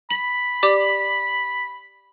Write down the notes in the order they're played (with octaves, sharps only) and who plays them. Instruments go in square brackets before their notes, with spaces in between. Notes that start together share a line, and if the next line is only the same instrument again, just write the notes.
[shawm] B5 [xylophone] F#7
[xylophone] G4 D5 D6